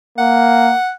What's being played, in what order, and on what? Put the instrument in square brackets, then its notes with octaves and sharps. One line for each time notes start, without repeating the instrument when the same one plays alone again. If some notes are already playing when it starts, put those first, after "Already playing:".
[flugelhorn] A#3 [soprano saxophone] F#5